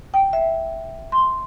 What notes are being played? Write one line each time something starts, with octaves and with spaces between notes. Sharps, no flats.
G5
E5
C6